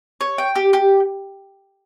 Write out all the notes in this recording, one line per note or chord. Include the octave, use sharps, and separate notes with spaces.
C#5
G5
G4
G4